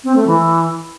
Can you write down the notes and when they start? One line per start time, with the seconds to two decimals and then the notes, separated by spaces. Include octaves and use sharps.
0.04 C4
0.16 A3
0.27 E3